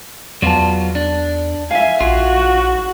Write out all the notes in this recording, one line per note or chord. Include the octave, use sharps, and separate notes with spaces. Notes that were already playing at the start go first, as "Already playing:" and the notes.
E2 F#3 B3 F4 D5 A5
D4
E5 F5 G#5
A#1 F4 F#4